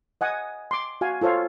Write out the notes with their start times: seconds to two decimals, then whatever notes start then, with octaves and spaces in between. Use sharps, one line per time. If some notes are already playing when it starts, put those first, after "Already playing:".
0.21 D#5 F#5 G#5 D#6
0.71 C6 D6
1.01 F#4 F5 G#5
1.22 F4 A4 C5 C#5 F5